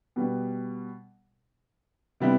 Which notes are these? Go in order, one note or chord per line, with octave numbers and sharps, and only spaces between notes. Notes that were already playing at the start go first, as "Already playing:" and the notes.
B2 G3 B3
C3 G3 B3 E4